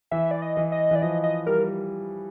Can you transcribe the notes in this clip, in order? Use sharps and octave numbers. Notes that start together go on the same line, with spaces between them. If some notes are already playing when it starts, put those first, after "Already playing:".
E3 E5
D5
D#5
E3
D#5
E3 D5
F3 D#5
D#5
G3 A#4